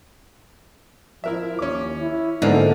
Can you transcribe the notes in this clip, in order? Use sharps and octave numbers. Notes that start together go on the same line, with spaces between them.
F3 E4 A#4 E5
D#2 C#4 D6
E4
G#2 D3 F3 G#3 A#3 B3 D#4 A#5